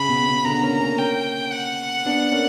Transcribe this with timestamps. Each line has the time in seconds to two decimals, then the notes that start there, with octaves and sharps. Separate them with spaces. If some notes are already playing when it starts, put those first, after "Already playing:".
Already playing: C#3 B5
0.08 B2
0.27 C#3
0.44 B2 D3 A#5
0.62 A#3 C#4
0.80 A#3 C#4
0.98 A#3 C#4 G5
1.52 F#5
2.05 B3 D4
2.32 A#3 C#4